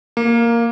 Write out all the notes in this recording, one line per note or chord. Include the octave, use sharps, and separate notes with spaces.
A#3